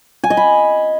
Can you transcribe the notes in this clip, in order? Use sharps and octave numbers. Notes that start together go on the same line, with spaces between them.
G#5
D#5
B5